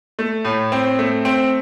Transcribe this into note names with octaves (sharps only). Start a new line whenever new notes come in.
A3
A2
C4
A3
C4